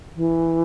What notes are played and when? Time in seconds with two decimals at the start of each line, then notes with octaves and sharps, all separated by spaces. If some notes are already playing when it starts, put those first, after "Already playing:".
0.16 E3